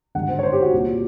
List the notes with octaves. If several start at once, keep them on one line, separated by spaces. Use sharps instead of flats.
G#1 G2 D3 F#5
C5
C#5
C5
G4
F#4
C2 A#2